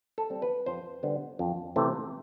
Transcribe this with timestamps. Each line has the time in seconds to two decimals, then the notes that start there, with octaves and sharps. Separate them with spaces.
0.18 A4
0.30 G3 C4
0.42 B4
0.66 F2 C5
1.03 D3 G3 B3
1.39 F2
1.76 C3 E3 A3 C4